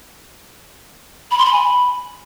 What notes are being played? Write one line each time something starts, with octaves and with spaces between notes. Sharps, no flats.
B5
C6
B5
G#5
B5